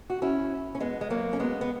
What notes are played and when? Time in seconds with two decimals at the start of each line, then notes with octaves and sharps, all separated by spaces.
0.10 F#4
0.22 C#4 E4
0.75 C#4
0.80 G#3 B3
1.01 G#3
1.10 F#3 A#3
1.33 C#4
1.40 G#3 B3
1.61 B3